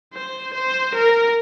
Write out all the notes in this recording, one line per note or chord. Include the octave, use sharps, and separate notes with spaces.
C5
C5
A#4